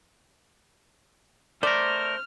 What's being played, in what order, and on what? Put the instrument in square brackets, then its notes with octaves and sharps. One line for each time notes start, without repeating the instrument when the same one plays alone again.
[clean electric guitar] A3 A#4 [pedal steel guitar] C5 [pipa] D5 [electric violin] F6